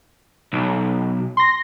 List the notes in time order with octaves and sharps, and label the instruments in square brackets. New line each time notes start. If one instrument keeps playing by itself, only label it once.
[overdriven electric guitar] B1
[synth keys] C6 A#6